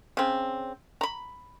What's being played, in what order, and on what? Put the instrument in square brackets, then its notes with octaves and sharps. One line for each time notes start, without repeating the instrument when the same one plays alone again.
[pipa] C#3 C4
A#5 B5